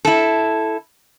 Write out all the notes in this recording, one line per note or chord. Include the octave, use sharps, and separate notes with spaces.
E4 A4